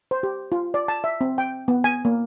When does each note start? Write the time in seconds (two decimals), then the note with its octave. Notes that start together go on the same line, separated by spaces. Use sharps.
0.11 C5
0.23 G4
0.52 F4
0.74 D5
0.88 A5
1.04 E5
1.21 C4
1.38 G5
1.68 B3
1.84 G#5
2.05 A#3